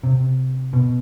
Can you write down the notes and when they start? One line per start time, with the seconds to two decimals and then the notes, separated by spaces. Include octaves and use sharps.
0.03 C3
0.73 B2